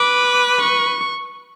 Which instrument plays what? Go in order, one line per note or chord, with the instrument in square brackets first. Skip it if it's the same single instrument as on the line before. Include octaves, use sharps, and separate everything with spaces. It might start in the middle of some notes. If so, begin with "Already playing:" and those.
Already playing: [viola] B4 [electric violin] D6
[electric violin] C#6